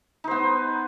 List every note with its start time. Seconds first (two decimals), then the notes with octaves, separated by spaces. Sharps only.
0.24 D#4
0.28 C5
0.31 B3